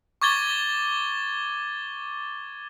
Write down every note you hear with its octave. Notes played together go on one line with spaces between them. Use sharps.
C#6 D6 G#6 A6 G7